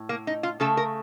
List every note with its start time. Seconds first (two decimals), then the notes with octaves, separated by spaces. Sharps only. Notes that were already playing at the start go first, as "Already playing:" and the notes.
Already playing: A2
0.09 A#3
0.27 D#4
0.43 F4
0.60 C#3 A3 A4
0.77 A#4